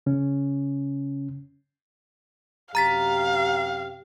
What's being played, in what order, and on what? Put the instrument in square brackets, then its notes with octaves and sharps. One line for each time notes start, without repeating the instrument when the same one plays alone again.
[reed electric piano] C#3 C#4
[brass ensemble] F#2 C3 G4 [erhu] F5 [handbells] A#5 A6 B6